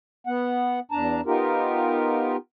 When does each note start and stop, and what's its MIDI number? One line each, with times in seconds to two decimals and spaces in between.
0.27 0.80 59
0.27 0.80 78
0.92 1.21 40
0.92 1.21 62
0.92 1.21 81
0.92 1.21 82
1.26 2.36 59
1.26 2.36 63
1.26 2.36 65
1.26 2.36 67
1.26 2.36 70